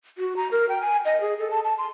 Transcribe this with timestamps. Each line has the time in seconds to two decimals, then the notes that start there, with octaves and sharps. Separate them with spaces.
0.18 F#4
0.37 A#5
0.51 A#4
0.69 G5
0.81 G#5
1.05 D#5
1.21 G#4
1.39 A4
1.51 A5
1.64 A5
1.78 C6